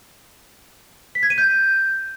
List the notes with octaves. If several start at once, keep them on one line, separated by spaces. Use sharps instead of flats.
B6
G#6
D#7
G6